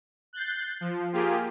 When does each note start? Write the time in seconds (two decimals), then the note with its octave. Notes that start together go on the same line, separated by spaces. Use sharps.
0.33 F#6 G6 A6 C7
0.81 F3
1.13 A#3 F4 G4 G#4